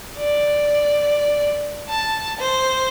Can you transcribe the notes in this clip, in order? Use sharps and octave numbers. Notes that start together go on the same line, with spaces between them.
D5
A5
C5